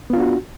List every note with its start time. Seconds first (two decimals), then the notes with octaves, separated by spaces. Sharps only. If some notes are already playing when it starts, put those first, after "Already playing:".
0.10 B3
0.13 F4
0.17 D4
0.20 F#4